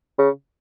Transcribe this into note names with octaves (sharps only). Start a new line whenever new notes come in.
C#3